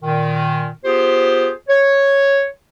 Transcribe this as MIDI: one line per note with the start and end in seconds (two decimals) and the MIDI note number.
0.03 0.67 46
0.03 0.67 51
0.85 1.50 59
0.85 1.50 65
0.85 1.50 67
0.85 1.50 68
0.85 1.50 72
1.69 2.46 73